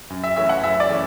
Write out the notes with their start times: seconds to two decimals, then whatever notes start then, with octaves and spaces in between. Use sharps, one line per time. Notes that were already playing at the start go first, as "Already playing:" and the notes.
0.10 F#2
0.24 E5
0.36 E3 A3 C#4 E5
0.49 F#5
0.63 F#2 E5
0.80 D5
0.89 E3 A3 C#4